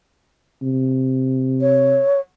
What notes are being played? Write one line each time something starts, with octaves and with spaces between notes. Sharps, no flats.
C3
C#5